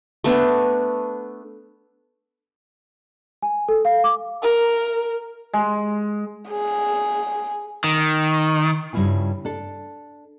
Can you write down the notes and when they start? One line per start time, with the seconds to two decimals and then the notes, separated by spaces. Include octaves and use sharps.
0.24 A3 B3 D4
3.42 G#5
3.69 A4
3.85 F5
4.04 D6
4.42 A#4
5.53 G#3
6.50 G#4
7.84 D#3
8.93 G2 C#3 G3 E4 F4 G#5
9.45 D4 A4